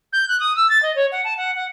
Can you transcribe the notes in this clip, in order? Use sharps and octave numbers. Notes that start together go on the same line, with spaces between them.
G6
F#6
D#6
E6
A6
D#5
C#5
F#5
A5
F#5
F#5